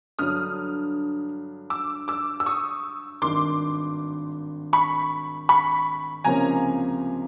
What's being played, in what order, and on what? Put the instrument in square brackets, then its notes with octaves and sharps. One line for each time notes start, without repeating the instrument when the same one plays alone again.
[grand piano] G2 D3 F#3 [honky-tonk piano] D#6 F6
[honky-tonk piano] D6 E6
D6 E6
E6
C#6 D#6
[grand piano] G#1 G2 D#3 [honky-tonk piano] C6 D6
[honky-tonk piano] B5 C#6
B5 C#6
[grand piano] C#2 C3 F3 A#3 C#4 [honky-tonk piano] G#5 A#5